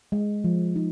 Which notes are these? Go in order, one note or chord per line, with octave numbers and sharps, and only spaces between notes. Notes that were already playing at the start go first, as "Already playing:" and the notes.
G#3
F3
D#4